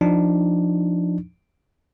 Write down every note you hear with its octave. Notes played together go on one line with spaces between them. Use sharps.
F3 D4 D#4